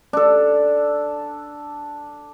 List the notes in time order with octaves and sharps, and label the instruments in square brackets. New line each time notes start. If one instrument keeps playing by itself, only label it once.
[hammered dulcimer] D4 A4